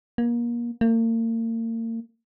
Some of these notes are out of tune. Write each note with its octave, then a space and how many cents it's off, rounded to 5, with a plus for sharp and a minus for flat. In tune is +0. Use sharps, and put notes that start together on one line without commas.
A#3 +30
A#3 -40